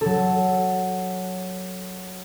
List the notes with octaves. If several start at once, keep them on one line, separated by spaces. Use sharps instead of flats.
F#3 A4